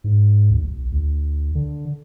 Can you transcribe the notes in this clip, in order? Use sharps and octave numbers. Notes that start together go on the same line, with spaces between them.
G#2
D2
B1
D2
D3